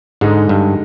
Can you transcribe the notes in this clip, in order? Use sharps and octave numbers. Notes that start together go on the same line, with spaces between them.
G#2 D3 G#3 D#4
G2